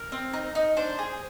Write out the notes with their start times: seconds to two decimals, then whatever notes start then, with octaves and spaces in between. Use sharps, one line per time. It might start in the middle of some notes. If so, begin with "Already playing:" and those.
Already playing: A#4
0.12 C4
0.33 D#4
0.55 D#4
0.77 D4 C5
0.99 G#4